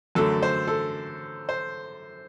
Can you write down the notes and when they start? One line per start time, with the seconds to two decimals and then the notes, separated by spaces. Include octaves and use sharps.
0.15 F#2 D3 F#3 A3 A4
0.43 C5
0.67 A4
1.49 C5